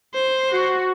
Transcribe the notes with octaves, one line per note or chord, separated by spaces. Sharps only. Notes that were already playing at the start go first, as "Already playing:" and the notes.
C5
F#4